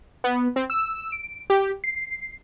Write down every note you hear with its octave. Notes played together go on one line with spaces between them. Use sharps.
B3
C4
E6
D7
G4
C7